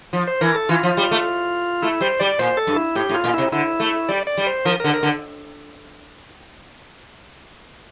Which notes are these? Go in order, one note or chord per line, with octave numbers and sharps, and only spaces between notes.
F3
C5
E3 A#4
A4
E3 F4
F3
G3
A3
A3 E4
G3 C5
G3 D5
A#2 C5
A4
G2
E4
A2 G4
A2
F4
A#2
C3 E4
D3 E4
A3
G3 D5
D5
G3
C5
F3 A#4
D3 A#4
A#4
D3